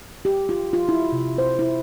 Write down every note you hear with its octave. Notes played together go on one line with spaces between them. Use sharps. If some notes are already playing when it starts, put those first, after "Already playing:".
G4
F4
F4
E4
C3
C5
E4